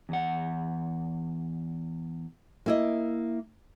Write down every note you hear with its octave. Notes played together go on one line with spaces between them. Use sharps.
E2 F#5
A#3 E4 D#5